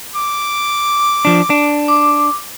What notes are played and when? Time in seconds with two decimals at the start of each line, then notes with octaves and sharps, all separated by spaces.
0.16 D6
1.25 F3 D4
1.50 D4
1.88 D6